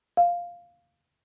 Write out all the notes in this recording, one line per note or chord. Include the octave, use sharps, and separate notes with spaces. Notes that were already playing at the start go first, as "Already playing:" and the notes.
F5